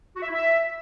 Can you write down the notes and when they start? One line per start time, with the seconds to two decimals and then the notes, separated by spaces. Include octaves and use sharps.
0.16 F#4
0.22 E5
0.27 E4
0.33 E5